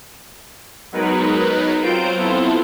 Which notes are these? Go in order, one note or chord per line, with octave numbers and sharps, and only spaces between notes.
F#3 G#3 B3 D#4 A#4 B4
F#3 C4 F4 C5 G6 D7
B3 C4 E4 F4 A4 C5